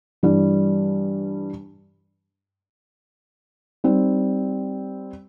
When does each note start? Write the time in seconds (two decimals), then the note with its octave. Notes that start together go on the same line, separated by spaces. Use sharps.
0.23 G2 E3 G3
3.84 G3 C4 D#4